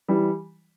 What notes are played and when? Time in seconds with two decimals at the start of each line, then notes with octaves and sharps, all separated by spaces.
0.08 E3 G3